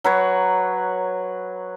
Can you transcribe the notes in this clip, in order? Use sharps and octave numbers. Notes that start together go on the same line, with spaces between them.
F#3 B4 C#5